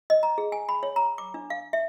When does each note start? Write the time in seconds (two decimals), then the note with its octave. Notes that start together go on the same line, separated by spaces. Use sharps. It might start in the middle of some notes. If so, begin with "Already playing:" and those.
0.10 D#5
0.23 A#5
0.38 G#4
0.52 G#5
0.69 B5
0.83 C#5
0.96 A#5
1.18 D6
1.34 D4
1.50 F5
1.73 E5